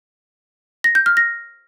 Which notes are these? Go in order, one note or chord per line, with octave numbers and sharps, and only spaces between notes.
A#6
G6
F6
A#6